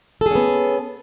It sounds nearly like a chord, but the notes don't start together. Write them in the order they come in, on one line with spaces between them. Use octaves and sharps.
A4 G#4 C#4 B3